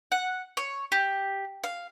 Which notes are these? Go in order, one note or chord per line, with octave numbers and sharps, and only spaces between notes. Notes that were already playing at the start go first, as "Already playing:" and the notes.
F#5
C#5
G4
F5